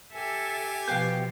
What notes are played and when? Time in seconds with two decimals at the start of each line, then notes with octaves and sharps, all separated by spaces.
0.13 G4 A4 E5 G#5
0.88 B2 F3 B4 F5 G5 G6 C7